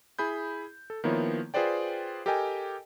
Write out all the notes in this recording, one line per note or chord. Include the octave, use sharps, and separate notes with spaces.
E4 G#4 B5 G6
A4
D#3 F3 A#3 B3 E4 C#5
F4 G#4 B4 C5 D5 G5
G4 A4 A#4 D#5 G5 G#5